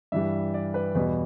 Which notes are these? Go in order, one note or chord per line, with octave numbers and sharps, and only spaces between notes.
G2 E3 G3 E5
D5
B4
E2 B2 G3 B4